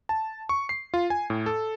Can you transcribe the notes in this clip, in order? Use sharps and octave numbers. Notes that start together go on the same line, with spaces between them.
A5
C#6
C7
F4
G#5
A2
A4